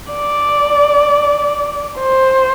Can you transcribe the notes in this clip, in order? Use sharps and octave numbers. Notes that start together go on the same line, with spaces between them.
D5
C5